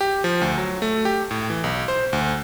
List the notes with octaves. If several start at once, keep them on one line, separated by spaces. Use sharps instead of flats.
G4
F3
D2
F#3
A3
G4
A2
E3
B1
C5
D2